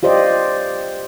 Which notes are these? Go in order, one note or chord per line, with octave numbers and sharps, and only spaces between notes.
F4 G4 C5 D5 D#5